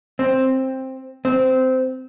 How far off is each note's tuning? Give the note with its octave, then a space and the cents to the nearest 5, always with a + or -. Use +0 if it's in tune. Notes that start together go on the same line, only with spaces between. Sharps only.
C4 +10
C4 -15